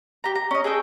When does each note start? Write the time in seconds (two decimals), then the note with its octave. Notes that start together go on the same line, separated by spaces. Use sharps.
0.24 G4 A#5
0.35 A#5
0.51 C#4 D#5
0.64 G#4 A4 D#5 G5